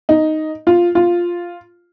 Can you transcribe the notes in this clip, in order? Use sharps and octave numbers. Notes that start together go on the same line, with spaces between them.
D#4
F4
F4